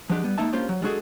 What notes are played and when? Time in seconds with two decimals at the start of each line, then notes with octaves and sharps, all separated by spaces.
0.10 F3 F#3 G#3 D4 G4
0.24 G3 B3
0.38 G#3 A#3 D#4 E5 A5
0.53 A#3 C#4 D4 F4 G4 C5
0.69 F#3
0.82 G3 G#3 D4 F#4 G#4 A4